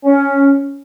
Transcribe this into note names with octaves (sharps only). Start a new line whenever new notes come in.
C#4